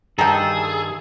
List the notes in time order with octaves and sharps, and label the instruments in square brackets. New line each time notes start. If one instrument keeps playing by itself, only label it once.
[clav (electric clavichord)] G2 D#3 [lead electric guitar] G#4 [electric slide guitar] A4 [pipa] G5 A#5